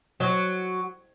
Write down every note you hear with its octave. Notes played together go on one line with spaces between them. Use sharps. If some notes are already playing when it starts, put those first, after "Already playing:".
F#3